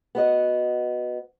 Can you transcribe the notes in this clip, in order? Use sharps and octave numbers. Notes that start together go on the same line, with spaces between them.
B3 F#4 D#5